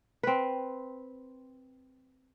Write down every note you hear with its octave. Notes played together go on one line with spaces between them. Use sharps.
C4 B4